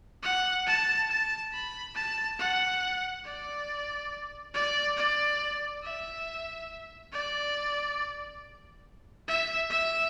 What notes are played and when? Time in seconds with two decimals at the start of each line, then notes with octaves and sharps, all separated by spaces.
0.23 F#5
0.67 A5
1.09 A5
1.53 B5
1.95 A5
2.39 F#5
3.25 D5
4.54 D5
4.97 D5
5.83 E5
7.12 D5
9.28 E5
9.70 E5